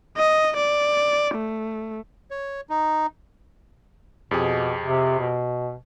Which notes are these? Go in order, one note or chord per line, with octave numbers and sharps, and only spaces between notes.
D#5
D5
A3
C#5
D#4
F2 B2 G4 G#4
C3
B2